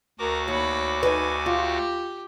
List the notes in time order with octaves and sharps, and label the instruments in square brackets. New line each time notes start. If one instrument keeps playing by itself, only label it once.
[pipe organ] D2 F#4 D6 [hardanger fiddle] A#4
[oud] D#2 [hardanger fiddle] C#5 B5
[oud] D#4 B4 [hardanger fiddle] G#5
[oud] F4 [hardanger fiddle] G4